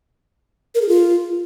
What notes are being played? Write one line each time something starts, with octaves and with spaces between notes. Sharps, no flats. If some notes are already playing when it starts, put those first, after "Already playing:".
A#4
G#4
F4